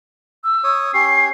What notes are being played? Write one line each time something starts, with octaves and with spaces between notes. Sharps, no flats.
E6
C#5 D#6
C#4 G4 C#5 C7